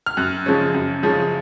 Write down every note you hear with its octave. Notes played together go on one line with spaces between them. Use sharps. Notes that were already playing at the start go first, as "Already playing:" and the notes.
F6
F#2 F#6
C#3 F3 G#3 C#4
F#2
C#3 F3 G#3 C#4